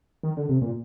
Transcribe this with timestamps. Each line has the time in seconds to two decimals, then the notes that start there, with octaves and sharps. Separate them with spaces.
0.23 D#3
0.37 D3
0.49 C3
0.62 A#2